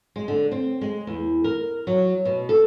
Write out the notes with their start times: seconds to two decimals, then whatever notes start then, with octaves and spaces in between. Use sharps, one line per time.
0.16 G#3
0.28 D3
0.51 C4
0.81 G#3
1.07 E2
1.44 A#4
1.87 F#3
2.25 B2
2.49 A4